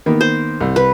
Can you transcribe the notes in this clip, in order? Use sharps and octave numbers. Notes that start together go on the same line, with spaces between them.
D#3 A#3 B3
C5
C2
B4